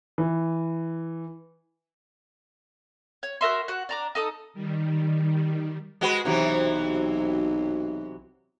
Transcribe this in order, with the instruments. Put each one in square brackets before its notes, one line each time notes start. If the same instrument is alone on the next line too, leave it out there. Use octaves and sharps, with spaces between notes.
[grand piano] E3
[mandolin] C#5
F#4 A#4 E5 C6
F#4 F#5
D4 A#5 D6
D#4 A4 D#6
[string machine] D#3 G3
[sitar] G#3 F#4 B4
[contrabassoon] B1 [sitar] C3 E3 F#3